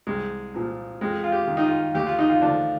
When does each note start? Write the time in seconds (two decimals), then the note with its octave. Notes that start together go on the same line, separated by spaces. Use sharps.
0.07 C2 G#3
0.54 A#2 F3
1.01 F2 G#3
1.24 F4
1.32 G4
1.47 D#3
1.57 D#4
1.64 F4
1.95 D2 G4
2.07 F4
2.19 D#4
2.30 F4
2.42 D3 F3 D4